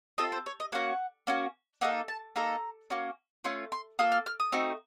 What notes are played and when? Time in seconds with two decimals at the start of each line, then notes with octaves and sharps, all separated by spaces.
0.18 C4 F4 A4 D#5
0.32 C5
0.46 C#5
0.60 D#5
0.72 A#3 C#4 F#4 F#5
1.27 A#3 C#4 F#4
1.81 A#3 D#4 A4 F#5
2.08 A5
2.36 A#3 D#4 A4 A#5
2.90 A#3 C#4 F#4
3.44 A3 C#4 F4 C6
3.72 C6
3.99 A#3 F4 A4 D#6
4.12 F6
4.26 F6
4.40 D#6
4.52 A3 C4 D#4 F#4